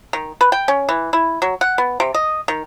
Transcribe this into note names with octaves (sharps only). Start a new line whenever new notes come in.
D#3
B4
G5
C#4
E3
E4
F#3
F#5
B3
C3
D#5
D#3